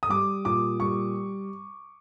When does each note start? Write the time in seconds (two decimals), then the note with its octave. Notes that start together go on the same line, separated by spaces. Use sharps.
0.03 D#6
0.09 G3 D6
0.45 A#2 D6
0.80 G3 C#6